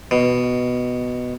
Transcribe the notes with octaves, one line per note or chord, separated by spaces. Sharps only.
B2